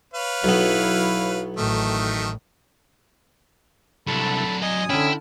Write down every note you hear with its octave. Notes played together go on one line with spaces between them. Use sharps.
B4 C#5 F5
B1 F#3 B3 E4
A1 A2 D#3 A3
C2 F#3 D4 A4 B5
D#5 G#5 D#6
D3 C#4 E4 G5